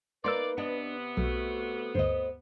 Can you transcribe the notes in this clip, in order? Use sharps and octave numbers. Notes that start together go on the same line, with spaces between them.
A#3 D#4 B4 D5 C6 E6
C3 B3 D4 D#5
B1 A3 F#4
D2 G2 C5 D#5